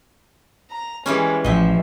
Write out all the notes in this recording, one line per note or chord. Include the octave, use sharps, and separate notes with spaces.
A#5
E3 G3 G#3 C#4
A1 F3 D#5 E5 G5